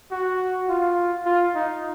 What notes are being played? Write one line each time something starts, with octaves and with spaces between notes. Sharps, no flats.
F#4
F4
F4
D#4